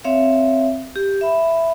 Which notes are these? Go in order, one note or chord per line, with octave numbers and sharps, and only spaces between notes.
C4 C#5 E5 F5
G4
E5 B5